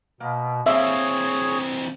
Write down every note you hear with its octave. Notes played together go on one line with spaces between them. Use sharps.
B2 A#3
E3 A#3 C4 G#4 C#5 E5 F5